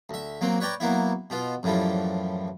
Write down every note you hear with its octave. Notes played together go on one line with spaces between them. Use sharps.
D2 E5
F#3 A#3 C4
B4 C#5 D5 G5 A#5
F#3 A#3 B3 E4
B2 B3 F4
F#2 A2 E3 F3 G3